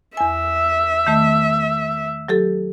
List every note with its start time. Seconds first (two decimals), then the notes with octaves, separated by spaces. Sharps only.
0.17 E2 E5 G#5
1.07 D#3 A3
2.28 F#3 G4 A4